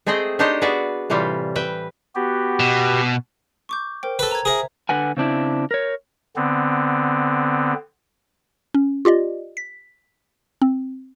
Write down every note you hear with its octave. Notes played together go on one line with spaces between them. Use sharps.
A3 C4 G#4 C5 D#5 G5
D4 D#4 G4 C5 C#5 D#5
B3 F#4 G#4 B4 D5 E5
A2 C3 E3 G3 F4
B4 E5 G5
B3 F#4 G4
B2
C#6 D6 G6
A#4 C5 G5
A4 B4
A#5 G#6
G#4 A#4 C5 E5
D3 B4 F#5 G#5
C#3 C4 D4 E4
A#4 C#5
D3 B3 C4
C#4
F4 G4 D5 D#5
B6
C4